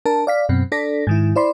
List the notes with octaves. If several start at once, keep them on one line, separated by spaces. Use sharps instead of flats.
D4 A#4 A5
D5 F5 B6
F#2 B2 C4
D4 A4 D5 A#6 B6
G#2 D#3 E4
E4 C5 D5 B5 C6